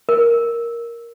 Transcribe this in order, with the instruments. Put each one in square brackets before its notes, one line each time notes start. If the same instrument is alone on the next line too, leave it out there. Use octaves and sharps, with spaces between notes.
[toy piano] A#4